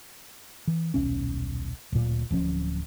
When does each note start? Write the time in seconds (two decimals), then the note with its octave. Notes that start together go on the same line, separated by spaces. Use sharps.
0.67 E3
0.94 D#1 B1 C#4
1.92 D1 A#2
2.31 D1 F3 C#4